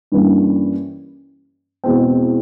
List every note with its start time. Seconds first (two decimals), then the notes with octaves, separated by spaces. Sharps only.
0.12 G2 E3 G3 A#3 C#4
1.84 E2 B2 G#3 C4